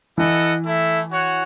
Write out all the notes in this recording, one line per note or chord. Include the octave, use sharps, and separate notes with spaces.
E3 E4 A4 D#5 F#5
A3 E4 A4 E5
F#4 C#5 F#5